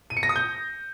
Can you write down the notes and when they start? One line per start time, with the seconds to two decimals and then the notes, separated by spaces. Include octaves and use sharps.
0.10 D#7
0.17 C#7
0.23 A#6
0.29 D#6
0.36 G6